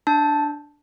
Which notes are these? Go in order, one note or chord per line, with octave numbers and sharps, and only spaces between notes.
D4 A5